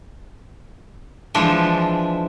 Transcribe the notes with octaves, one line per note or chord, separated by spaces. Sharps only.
E3 F3 G#3 D4 E5